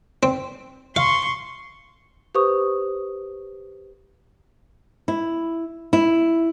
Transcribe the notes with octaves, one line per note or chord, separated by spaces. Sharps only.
C4
F5 C6 C#6
G4 B4 C5 C#6 D#6
E4
E4